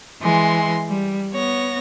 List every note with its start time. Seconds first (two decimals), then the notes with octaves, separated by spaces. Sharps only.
0.21 E3 G#3 C6
0.88 G3
1.33 B3 C#5 A#6